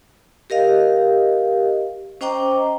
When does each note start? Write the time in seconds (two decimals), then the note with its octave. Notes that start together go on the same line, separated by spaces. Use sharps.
0.50 G4 A#4 D#5 F5
2.21 C#4 C5 D#5 G5 A#5 D6